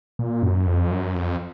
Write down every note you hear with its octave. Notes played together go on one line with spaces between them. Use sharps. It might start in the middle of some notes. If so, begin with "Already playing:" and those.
A#2
F#2
F2
F#2
F2